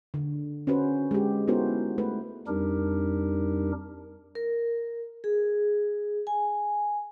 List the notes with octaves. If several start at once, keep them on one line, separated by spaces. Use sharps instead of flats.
D3
C#4 F#4 B4 C5
G#3 G4
B3 D#4 E4 F#4 A#4 C5
A3 B4
F2 G3 D4 D#4 G4 A#4
A#4
G#4
G#5